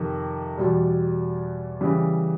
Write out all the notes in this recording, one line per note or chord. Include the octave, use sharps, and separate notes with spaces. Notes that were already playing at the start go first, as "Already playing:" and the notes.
Already playing: F2 C3 D#3
E2 B2 G3
C#3 E3 G3